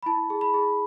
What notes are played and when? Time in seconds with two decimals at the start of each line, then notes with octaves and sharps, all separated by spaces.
0.03 B5
0.06 E4 A5
0.30 G#4
0.41 B5
0.54 G#4